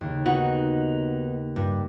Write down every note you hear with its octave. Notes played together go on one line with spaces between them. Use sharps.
D#2 C#3
B3 D#4 F#4
G2